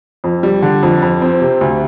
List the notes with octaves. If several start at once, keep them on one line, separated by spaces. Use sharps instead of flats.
F2
G3
D3
F2
F2
C4
C3
D2